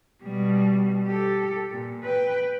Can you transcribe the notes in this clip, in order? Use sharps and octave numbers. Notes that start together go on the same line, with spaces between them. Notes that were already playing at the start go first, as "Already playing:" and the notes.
B2 G3
G4 A4
A#2
B4 G5